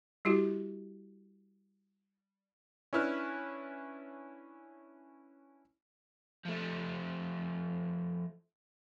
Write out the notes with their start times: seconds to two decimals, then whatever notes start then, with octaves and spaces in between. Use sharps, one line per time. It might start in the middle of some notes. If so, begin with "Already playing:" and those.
0.25 G3 E4 F#4 G4
2.93 C#4 D4 E4 B4 F6
6.45 F3 A3